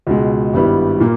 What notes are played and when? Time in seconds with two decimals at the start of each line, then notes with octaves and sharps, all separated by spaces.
0.07 C#2 B2 G#3
0.53 G#1 G2 G3 B3 E4
1.00 A#2 A#3